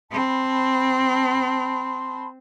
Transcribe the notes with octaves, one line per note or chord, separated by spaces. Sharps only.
C4 A5 B5 C6